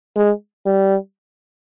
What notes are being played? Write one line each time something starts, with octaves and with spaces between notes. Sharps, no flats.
G#3
G3